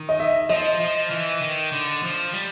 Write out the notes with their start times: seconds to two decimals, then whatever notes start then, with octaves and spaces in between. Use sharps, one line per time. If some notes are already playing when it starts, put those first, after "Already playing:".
Already playing: D#3
0.09 D#5
0.19 E5
0.49 F3 D#5
0.80 F3
1.11 E3
1.41 D#3
1.72 D3
2.03 F3
2.33 G3